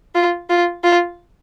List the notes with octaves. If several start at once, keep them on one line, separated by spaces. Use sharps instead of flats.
F4
F4
F4